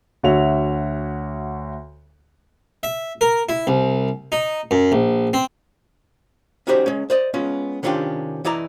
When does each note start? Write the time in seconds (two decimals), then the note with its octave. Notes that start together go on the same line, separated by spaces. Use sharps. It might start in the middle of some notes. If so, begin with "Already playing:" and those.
0.23 D2 F#4 C#5 E5 F7
2.83 E5
3.21 A#4
3.49 E4
3.67 C2
4.32 D#4
4.71 F#2
4.92 A#1
5.33 C4
6.67 C#4 D#4 F#4 G4 C5 D5
6.86 G#3 C#4
7.10 C5 D5 D#5
7.34 G#3 B3 C#4 F4
7.83 C3 D#3 C#4 D4 F4 G4
8.45 E3 E4 D5 D#5 A#5